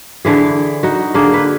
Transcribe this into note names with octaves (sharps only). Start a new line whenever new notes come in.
D3 E3 G#4
D#4 F#4
D3 A#3 G#4
B4